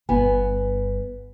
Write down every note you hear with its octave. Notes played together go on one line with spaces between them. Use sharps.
G1 G2 B3 G#5